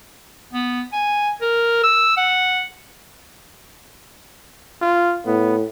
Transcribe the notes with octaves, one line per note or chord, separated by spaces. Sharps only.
B3
G#5
A#4
E6
F#5
F4
A2 B3